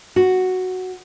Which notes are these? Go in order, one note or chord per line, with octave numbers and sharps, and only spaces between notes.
F#4